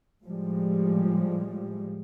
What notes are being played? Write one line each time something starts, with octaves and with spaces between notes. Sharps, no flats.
A2 F3 G3 G#3